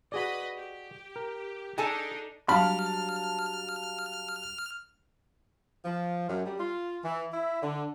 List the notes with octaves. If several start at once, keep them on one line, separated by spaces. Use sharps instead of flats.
F#4 G#4 B4 D5 D#5 B5
G4
A#4
D4 D#4 G#4 A4 D#5 G#5 A5
F#3 G3 D4 F5 A5 B5 F6
F3
F#2
G3
F4
E3
E4
D3